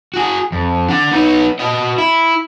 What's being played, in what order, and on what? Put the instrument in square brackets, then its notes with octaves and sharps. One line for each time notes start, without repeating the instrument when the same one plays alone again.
[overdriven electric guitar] F#4 G#4
F2
D4 F#5
B3 D#4
F#4 D#5
E4